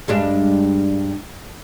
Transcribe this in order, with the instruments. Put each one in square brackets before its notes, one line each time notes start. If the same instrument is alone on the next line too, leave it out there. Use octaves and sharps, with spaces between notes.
[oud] G2 G#3 D4